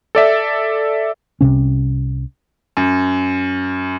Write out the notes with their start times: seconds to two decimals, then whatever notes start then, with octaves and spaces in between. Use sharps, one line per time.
0.15 A4 D5 E5
1.41 C2 C3 C#4
2.77 F#2